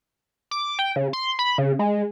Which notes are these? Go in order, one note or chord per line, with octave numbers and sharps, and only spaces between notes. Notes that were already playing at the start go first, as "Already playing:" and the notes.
D6
G5
C#3
C6
B5
C#3
G#3